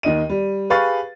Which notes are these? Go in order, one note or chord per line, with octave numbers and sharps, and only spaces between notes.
D#2 D#3 D#5 D#7
G3
G4 G#4 B4 F5 C#6 A6